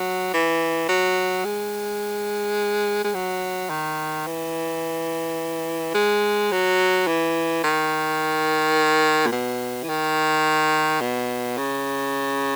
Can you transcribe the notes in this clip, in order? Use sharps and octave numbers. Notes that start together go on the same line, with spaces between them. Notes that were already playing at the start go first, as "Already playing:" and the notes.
Already playing: F#3
E3
F#3
G#3
G#3
F#3
D#3
E3
G#3
F#3
E3
D#3
A#2
B2
E3
D#3
B2
C#3